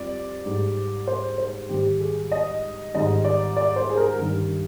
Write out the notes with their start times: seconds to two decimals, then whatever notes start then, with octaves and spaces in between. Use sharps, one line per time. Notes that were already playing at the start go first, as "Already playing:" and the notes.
Already playing: F2 G3 D5
0.45 G#2 G3
1.07 C5
1.38 C5
1.69 G#2 D#3 G3 G4
2.00 G#4
2.32 D#5
2.94 G#2 D#3 G3 D#5
3.25 D5
3.56 D5
3.76 C5
3.90 G#4
3.97 A#4
4.18 G2 D#3 G3